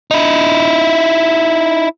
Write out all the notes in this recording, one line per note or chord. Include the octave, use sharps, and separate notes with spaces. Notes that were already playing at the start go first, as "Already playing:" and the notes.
D#4 E4